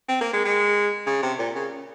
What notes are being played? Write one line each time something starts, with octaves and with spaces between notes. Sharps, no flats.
C4
A#3
G#3
G#3
C#3
C3
A#2
C#3